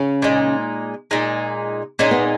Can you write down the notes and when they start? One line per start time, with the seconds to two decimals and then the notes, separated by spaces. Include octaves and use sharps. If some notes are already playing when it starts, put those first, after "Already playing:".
Already playing: C#3 C#4
0.22 A#2 G#3 D#4
1.11 A#2 G#3 D#4
1.99 A#2 G#3 C#4 D#4
2.11 B3